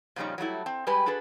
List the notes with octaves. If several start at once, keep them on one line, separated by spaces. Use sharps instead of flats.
A#2 C#3 F3 G3 C#4 D#4
F#3 G3 A3 E4
C4
G3 G#3 G4 B4 G#5
D4 F#4 G#4 A4 B4